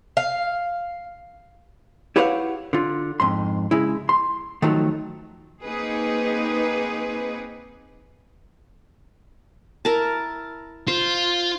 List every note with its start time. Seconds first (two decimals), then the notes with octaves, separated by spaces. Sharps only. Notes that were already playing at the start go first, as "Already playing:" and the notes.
0.17 F5
2.16 E4 G4 B4 C#5 F5 F#5
2.73 D3 F4
3.20 F2 G#2 C6
3.71 C#3 G#3 E4
4.09 C6
4.62 D#3 F3 F#3 A3 D#4
5.64 A#3 C4 D#4 G#4 B4
9.85 E4 A#4 A5
10.88 F4 C5